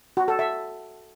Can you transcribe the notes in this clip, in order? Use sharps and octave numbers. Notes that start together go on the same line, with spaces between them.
F#4
A4
E5